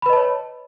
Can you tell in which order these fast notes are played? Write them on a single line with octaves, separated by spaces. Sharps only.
B5 B4 D#5 A5 C#5